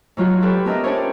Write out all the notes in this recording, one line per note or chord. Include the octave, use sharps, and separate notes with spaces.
G#2 F#3 F4 F#4
F4 G4 A4 B4 C#5
B3 D4 A#4 D#5 E5
C#4 D4 G4 C5 C#5